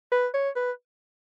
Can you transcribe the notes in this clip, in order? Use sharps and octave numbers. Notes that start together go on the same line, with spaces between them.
B4
C#5
B4